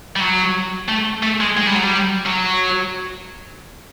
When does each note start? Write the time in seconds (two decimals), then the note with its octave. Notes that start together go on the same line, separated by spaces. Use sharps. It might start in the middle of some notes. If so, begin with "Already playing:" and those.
0.16 G3
0.20 F#3
0.89 A3
1.23 A3
1.41 G#3
1.57 G#3
1.67 G3
1.75 F#3
1.84 G3
2.26 F#3